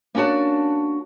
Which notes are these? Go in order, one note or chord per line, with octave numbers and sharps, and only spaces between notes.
A#3 C#4 D4 F#4 A5